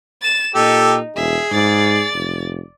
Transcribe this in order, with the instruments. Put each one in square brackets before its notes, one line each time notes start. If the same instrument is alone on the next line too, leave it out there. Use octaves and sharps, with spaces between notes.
[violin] A6 E7
[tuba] A#2 [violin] D#4 [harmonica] G4 A4
[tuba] E1 [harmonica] G#4 [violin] E5
[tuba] G#2 [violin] D5 A6
[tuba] F1